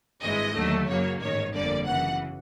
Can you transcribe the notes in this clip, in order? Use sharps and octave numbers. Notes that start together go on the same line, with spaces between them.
G#1 G2 E3 G#3 D#5
D#2 D3 F#3 A3
F#2 C#3 F#3 A#3 C#5
A1 G#2 D#3 C#5
G1 F2 D3 G3 A#3 D5
F#2 C#3 E3 F#5